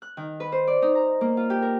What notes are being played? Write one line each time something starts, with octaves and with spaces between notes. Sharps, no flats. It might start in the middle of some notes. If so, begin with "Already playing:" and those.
F#6
D#3
B4
C5
D5
D#4
A#5
A#3
F4
G4
A#4